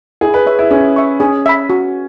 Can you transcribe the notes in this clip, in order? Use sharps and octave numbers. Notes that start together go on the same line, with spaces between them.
E4 G#4
B4
G#4 C#5 E5
E4
C#4 G#4
E5 C#6
C#4 G#4
E5 B5
F#4